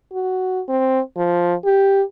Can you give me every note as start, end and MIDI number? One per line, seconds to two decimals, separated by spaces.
0.13 0.61 66
0.68 1.00 60
1.17 1.54 53
1.65 2.02 67